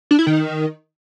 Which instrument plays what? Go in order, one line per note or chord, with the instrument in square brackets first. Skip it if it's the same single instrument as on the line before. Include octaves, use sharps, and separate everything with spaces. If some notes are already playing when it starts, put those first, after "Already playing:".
[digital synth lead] D4
E4
D#3